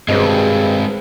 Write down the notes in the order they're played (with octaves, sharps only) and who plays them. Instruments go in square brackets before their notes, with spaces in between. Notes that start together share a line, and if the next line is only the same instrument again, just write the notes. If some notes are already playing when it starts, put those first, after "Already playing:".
[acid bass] G2 [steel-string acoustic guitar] B2 F#3 B4 [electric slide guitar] G#3 C4 [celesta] G#4 D#5